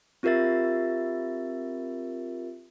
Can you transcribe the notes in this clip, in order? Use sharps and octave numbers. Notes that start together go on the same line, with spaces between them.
C4 F4 G4 A#4 E5 A6